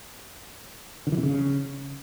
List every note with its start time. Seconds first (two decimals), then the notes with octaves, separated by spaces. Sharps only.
1.07 D3
1.12 E3
1.18 C3
1.23 C#3